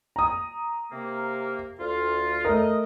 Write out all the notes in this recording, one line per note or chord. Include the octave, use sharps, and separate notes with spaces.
A#5 D#6
C3 A#3
D2 F4
A3 A#4 D#5